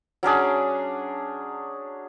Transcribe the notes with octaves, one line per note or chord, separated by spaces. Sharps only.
F#3 C#4 D4 G#4